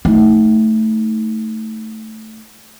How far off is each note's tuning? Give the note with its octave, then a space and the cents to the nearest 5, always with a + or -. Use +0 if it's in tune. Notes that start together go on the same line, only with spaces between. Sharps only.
A3 +0 D#4 +30